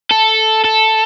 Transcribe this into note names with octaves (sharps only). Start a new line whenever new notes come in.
A4
A4